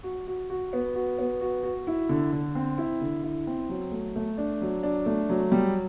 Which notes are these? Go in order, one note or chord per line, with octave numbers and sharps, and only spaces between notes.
F#4
F#4
F#4
B3
F#4
B3
F#4
F#4
E4
D3
D3
C4
E4
D3
E4
C4
F#3
A3
A3
D4
F#3
D4
A3
F#3
G3